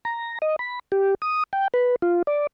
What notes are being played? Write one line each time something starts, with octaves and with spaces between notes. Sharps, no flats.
A#5
D#5
B5
G4
D#6
G5
B4
F4
D5